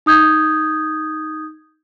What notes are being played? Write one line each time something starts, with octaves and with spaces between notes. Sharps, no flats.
D#4 D#6 G6 G#6